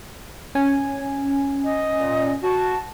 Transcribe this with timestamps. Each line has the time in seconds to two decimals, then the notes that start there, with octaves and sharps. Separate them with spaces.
0.55 C#4 G#5
1.64 D#5
2.01 A#2
2.43 F#4 A5